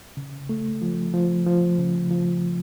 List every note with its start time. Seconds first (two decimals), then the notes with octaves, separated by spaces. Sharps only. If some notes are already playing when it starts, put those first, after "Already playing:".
0.17 C#3
0.49 A3
0.82 F3
1.14 F3
1.46 F3
1.79 C#3
2.11 F3